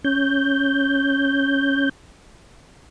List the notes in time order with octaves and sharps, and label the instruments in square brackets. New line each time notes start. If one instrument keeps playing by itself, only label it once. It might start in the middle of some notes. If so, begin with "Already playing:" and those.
[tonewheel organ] C#4 G6